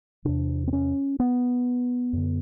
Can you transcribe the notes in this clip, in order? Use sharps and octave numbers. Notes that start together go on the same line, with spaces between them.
E2 C3 D4
C4
C#4
B3
F#2 D3